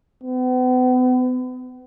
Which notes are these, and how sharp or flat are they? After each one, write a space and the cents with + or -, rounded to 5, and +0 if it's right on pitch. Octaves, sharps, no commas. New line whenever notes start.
B3 +40